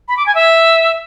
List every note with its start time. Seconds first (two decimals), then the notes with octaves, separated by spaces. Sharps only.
0.08 B5
0.17 D6
0.26 G#5
0.35 E5